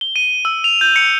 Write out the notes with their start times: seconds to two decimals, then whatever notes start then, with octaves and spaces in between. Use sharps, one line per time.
0.01 G7
0.16 D#7
0.45 E6
0.64 F7
0.81 G6
0.96 C#7